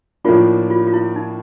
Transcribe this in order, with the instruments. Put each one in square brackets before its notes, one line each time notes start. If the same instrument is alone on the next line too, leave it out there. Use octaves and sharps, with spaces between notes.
[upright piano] A2 F3 A#3 D4 [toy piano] F4
[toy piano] F4
F4
E4
D#4